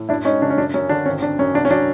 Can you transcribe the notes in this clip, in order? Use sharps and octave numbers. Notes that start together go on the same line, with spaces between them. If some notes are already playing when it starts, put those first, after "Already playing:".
Already playing: A2
F#2 D4 E4
G#3 C#4 D#4
C#3 D4
C#4
F#2 D4
F#2 C#4
D3 D4
G#1 C#4
G#1 D4
F#2 C#4
C2 D4
C#4
F#3 D4